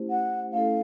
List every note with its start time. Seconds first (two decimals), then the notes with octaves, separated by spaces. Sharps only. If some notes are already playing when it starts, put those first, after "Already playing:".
Already playing: A3 C#4 E4 G4 C5
0.10 F#5
0.53 A3 C#4 E4 A4 F5